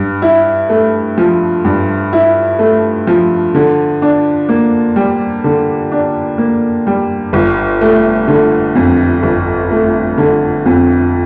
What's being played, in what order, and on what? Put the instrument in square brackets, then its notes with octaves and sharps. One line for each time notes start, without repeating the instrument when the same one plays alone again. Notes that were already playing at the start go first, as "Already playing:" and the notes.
Already playing: [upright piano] G2
E4
A3
F3
G2
E4
A3
F3
D3
D4
A#3
G3
D3
D4
A#3
G3
G1
A3
D3
F2
G1
A3
D3
F2